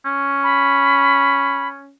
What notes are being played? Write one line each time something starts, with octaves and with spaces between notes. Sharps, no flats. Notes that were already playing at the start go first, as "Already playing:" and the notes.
C#4
B5